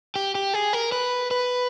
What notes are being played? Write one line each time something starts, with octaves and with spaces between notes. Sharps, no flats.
G4
G4
G#4
A#4
B4
B4